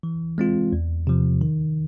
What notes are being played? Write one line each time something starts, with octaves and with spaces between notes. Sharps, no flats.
E3
G#3 C4 F4
E2
C3 F3
D#3